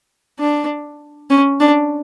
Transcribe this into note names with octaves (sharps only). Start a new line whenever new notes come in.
D4
C#4
D4